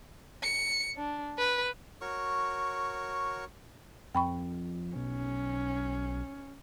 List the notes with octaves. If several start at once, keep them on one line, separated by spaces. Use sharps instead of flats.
C#7
D4
B4
F#4 A#4 C#5 C#6
F2 G5 B5 C#6
B1 C#4